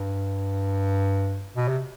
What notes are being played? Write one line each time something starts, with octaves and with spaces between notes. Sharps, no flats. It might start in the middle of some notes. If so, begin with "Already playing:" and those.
Already playing: G2
B2
C3